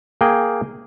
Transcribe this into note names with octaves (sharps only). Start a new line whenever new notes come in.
A#3 G#4 G5